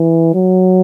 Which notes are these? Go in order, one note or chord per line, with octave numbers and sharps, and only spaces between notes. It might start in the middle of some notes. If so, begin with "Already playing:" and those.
Already playing: E3
F#3